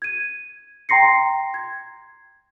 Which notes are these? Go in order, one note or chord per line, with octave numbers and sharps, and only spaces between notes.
G#6 D#7
G5 A#5 C6 A#6 C7 C#7
G#6